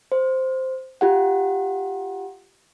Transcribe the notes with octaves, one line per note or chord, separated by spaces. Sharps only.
C5
F4 G4 F#5